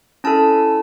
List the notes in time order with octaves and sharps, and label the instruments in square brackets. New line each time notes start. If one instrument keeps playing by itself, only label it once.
[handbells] C#4 E4 A4 A5